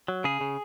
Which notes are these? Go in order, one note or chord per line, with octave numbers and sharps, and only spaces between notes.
F#3
C#3 G#4
C#3